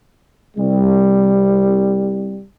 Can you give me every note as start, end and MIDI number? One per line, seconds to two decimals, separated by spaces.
0.57 2.43 36
0.57 2.43 55